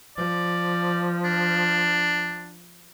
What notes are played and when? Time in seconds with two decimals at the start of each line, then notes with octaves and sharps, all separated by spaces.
0.17 F3 D5
1.24 D4